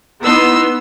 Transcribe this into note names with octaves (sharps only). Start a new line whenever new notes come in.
B3 D#4 E4 C6 E6